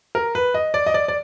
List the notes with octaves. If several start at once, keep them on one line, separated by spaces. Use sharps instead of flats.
A#4
B4
D#5
D5
D#5
D5
D5